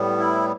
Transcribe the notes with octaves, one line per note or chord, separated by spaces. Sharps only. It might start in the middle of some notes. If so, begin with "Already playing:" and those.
Already playing: A2 G3 B3
E4